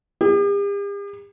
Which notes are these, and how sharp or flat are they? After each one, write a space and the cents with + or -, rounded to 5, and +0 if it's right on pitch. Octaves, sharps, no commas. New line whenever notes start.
G4 +45